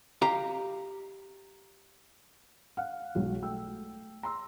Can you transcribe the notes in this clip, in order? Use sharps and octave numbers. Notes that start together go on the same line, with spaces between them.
G4 F5 A#5
F5 F#5 F6
B1 F#3 G#3
A3 G5 E6
A#5 C6 E6